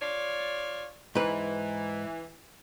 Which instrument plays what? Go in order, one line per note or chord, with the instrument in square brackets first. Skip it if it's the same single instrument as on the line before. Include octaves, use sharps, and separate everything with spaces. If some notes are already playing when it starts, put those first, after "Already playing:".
[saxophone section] F4 C#5 D5
[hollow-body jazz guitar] G#2 B4 [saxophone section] E3